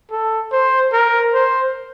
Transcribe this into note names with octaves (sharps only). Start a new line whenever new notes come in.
A4
C5
A#4
C5